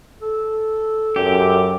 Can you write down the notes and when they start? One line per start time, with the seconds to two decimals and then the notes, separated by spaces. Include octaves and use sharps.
0.22 A4
1.16 F#2 G4